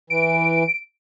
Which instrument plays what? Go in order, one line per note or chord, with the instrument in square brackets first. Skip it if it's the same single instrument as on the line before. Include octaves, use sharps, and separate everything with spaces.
[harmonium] E3 [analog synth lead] D7